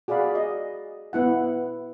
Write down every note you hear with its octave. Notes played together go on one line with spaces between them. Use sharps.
F#4 G#4 D5 F5 B5
D#5
B3 E4 F#5